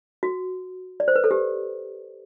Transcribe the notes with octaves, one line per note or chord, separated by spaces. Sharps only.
F#4
D5
C5
B4
A4
G4